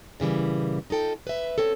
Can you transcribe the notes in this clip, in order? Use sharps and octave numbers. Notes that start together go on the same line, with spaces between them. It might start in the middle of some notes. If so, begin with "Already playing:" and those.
A#2 C#3 E3 G3
D#4 F4 A4 G5
B4 E5
C4 C#4 A4